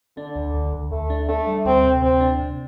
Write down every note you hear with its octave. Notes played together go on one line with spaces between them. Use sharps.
D3 D4
D2
D2
D2
D2 A3
D4
A3 D4
G3
D2 C4
C3
D2 C4
D4
C3